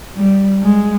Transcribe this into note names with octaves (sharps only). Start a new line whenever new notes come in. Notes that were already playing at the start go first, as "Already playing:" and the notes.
G3
G#3